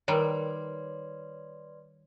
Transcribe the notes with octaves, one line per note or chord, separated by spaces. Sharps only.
D#3 G3 A#4 B4 C#5 D5 G#5 C6